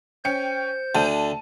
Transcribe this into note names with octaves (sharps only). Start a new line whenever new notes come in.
C#4 C5 G5 G6 C#7
D2 D3 A5 D#7